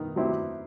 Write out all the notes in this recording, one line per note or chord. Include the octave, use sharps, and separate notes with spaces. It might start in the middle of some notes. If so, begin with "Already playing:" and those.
Already playing: D#3 B3 D#4
F#3 C4 E4 G4